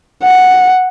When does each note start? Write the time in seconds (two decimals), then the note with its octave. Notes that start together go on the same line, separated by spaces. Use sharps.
0.24 F#5